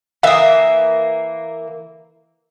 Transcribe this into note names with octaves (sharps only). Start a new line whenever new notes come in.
E3 A#3 E5 F5 D#6